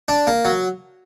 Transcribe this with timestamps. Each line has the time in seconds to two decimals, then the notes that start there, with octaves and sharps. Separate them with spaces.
0.08 D4
0.27 A#3
0.45 F#3